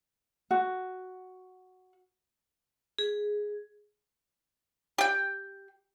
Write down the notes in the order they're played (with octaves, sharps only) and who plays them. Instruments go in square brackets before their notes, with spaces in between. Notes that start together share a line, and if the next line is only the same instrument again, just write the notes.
[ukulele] F#4
[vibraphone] G#4
[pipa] G4 G5